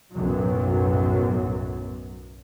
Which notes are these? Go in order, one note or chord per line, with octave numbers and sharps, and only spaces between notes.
B1 F#2 A2 F#3